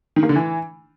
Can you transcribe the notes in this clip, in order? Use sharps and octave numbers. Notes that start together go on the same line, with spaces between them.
D#3
A#3
D3
E3